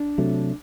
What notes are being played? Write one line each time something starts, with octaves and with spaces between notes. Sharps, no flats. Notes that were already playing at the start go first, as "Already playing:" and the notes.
Already playing: D4
C3 F#3 A3